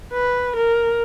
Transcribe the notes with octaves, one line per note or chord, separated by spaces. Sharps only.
B4
A#4